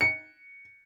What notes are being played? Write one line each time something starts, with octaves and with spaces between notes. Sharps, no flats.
C#7